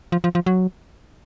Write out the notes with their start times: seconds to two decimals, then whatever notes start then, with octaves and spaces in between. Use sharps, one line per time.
0.12 F3
0.24 F3
0.35 F3
0.46 F#3